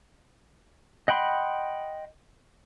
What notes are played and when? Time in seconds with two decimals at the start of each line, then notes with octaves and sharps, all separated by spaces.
1.08 D#5 F#5 G5 B5 C6